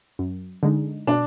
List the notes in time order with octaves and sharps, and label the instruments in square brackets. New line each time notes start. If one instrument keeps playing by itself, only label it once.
[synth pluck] F#2
D3 G#3 D#4
[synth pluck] B2 [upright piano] D4